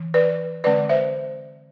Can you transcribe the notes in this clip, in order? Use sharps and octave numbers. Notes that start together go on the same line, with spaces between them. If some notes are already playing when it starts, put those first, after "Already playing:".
Already playing: E3
B4 D5
D3 G#3 C4 B4 D5
C5 E5